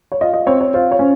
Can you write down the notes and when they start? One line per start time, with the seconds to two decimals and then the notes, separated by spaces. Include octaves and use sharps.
0.12 C#5
0.21 F4 D#5
0.34 D#5
0.46 C4 C#5
0.61 C#5
0.74 F4 C5
0.91 C#5
0.99 C#4 C5